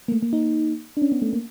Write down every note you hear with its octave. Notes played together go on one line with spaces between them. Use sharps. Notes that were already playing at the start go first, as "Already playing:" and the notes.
A#3
A3
A#3
D#4
D4
C#4
B3
A3
A#3